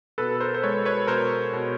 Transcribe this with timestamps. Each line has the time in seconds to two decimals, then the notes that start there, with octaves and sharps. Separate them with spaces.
0.18 B2 A4 B4
0.41 A#4 C5
0.54 C5
0.63 G#3 B4 C#5
0.85 B4 C#5
1.07 B2 A#4 C5
1.53 B2